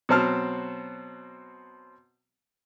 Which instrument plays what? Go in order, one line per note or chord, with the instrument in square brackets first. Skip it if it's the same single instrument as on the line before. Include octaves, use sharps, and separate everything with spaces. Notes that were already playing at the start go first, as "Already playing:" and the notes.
[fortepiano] B2 F#3 C4 A5 F6